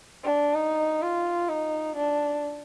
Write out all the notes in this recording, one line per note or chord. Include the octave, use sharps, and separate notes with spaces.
D4
D#4
F4
D#4
D4